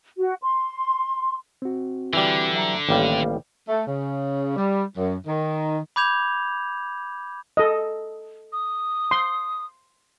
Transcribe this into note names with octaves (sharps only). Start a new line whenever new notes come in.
F#4
C6
C4 F#4
D3 E3 G3
F#3 E5 A#5
A1 D#3 G3 A#3 F5
A3
C#3
G3
F#2
D#3
B5 D6 G6 G#6 F7
A4 D#5
D#6
C6